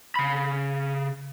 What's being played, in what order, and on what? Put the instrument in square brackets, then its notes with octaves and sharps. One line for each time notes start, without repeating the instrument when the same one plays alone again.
[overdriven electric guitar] C#3 B5